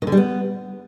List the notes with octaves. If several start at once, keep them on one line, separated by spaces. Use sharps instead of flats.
D#3
D3
G3
B3